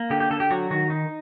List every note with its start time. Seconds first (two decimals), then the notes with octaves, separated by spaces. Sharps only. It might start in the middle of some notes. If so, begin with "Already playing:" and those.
Already playing: A#3
0.10 D3 G4
0.20 G4
0.30 D3 A4
0.40 G4
0.50 F#3 F#4
0.70 D#3 F#4
0.90 D#4